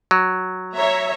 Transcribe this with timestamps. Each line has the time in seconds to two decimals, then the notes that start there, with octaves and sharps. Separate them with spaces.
0.11 F#3
0.75 C#5 E5 A#5